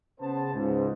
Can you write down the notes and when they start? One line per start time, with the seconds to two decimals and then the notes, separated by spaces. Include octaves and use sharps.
0.20 C#3 B3 C5 A5
0.54 C#2 G#2